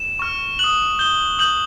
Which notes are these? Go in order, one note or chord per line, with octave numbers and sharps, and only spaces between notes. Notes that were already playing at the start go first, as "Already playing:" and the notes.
Already playing: E7
C#6 F6
D#6 F#6 F#7
D#6 G6 G7
D#6 G6 F#7